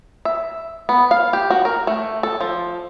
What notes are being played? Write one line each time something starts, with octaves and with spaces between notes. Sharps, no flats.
E5
B3
F5
G4
F#4
A#4
A3
A4
F3